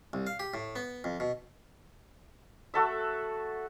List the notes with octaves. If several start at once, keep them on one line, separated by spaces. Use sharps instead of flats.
C2
F5
G4
A2
B3
F2
B2
A3 F#4 A4 E5